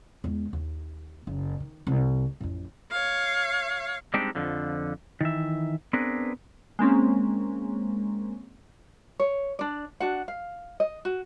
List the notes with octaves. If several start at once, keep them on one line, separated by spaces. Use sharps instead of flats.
E2 G#3
D#2
F#1
D#3
C2
A1 F2
C#5 F5
G3 G#3 C4 D4 D#4 G4
F2 D3 F3
D#3 E3 E5
B3 C4 D4 G#4 A#4 B4
G#3 A#3 C4 C#4
C#5
D4 D5
D4 F#4 F#5
F5
D#5
F#4